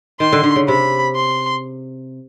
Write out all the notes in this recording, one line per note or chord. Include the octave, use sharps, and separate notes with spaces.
D#3 C6
D3
D3
C#3
C3 B5
C6